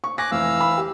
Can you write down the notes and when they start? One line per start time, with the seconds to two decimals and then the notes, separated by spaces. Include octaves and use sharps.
0.04 C#6
0.18 G#5 D6 F#6 A#6
0.31 F1 E3 F5 E6
0.61 B5
0.78 G4